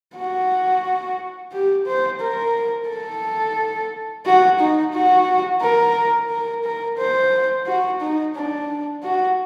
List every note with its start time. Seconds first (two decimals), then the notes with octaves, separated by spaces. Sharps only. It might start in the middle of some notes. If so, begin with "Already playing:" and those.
0.16 F#4
1.52 G4
1.86 C5
2.21 A#4
2.89 A4
4.26 F#4
4.60 D#4
4.93 F#4
5.61 A#4
6.30 A#4
6.65 A#4
6.98 C5
7.67 F#4
8.01 D#4
8.36 D4
9.03 F#4